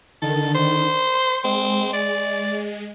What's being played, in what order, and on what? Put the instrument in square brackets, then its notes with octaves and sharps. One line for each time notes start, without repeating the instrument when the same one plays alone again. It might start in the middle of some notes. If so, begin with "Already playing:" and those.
[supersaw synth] D3 D#3 [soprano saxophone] A4
[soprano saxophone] C5
[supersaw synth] C6
[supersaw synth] G#3 [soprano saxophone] C4
[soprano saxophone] D5